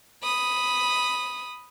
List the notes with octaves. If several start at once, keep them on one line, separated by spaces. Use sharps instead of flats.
B5 D#6